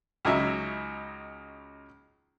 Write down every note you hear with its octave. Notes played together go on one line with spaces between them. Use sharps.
C#2 C#3 F#3 D#4 E5